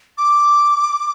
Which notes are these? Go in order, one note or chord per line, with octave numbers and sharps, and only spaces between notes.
D6